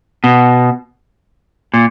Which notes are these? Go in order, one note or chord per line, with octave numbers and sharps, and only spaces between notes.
B2
A#2